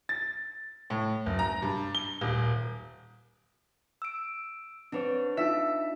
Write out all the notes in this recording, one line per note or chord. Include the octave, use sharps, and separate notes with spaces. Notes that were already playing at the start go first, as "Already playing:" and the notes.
A6
A2
F#1
A#5
G2
G7
D#1
E6 D7
C4 D4 B4 C#5
D#4 F4 E5